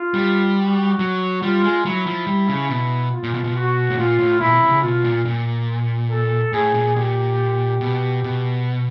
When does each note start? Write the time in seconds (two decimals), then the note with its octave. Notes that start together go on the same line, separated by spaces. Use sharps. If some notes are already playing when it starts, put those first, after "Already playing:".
Already playing: F4
0.14 G3
0.56 F#4
0.99 F#3
1.42 G3 F4
1.64 G#3
1.84 F#3 E4
2.06 F3
2.27 G3
2.49 C#3
2.70 B2
3.12 F4
3.23 A#2
3.34 B2
3.44 B2
3.55 F#4
3.90 A2
3.98 A#2 F4
4.19 A2
4.40 A#2 E4
4.51 B2
4.62 C3
4.72 C#3
4.82 B2 F4
5.04 A#2
5.25 A#2
6.11 A4
6.53 A2 G#4
6.74 A#2
6.96 A#2 G4
7.81 B2
8.24 B2